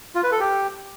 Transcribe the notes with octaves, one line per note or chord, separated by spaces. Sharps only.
F4
B4
A4
G4